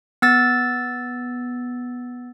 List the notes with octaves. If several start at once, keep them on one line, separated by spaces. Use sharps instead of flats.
B3 E6 A6